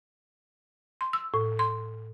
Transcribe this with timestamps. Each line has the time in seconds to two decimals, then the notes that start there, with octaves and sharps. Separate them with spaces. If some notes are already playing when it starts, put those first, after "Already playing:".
1.01 C6
1.13 E6
1.34 A2
1.59 C6